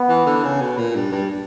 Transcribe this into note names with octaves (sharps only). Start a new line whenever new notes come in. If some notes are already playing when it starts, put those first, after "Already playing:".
Already playing: B3
E3
D3
C#3
B2
A#2
G2
G2